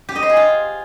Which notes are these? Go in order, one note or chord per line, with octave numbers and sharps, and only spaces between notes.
G4
D#5
C5
G#4
F4